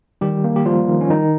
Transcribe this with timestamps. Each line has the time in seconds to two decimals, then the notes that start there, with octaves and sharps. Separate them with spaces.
0.21 D#3 G3 G4
0.44 A#3
0.56 G4
0.65 F3 G3 F4
0.88 D#3
1.01 C#4
1.10 D#3 D#4